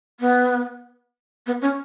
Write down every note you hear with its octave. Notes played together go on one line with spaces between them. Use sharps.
B3
B3
C#4